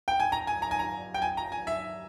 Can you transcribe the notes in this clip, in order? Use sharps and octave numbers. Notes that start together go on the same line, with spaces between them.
G5
G#5
A#5
G#5
A#5
G#5
A#5
G5
G#5
A#5
G#5
E5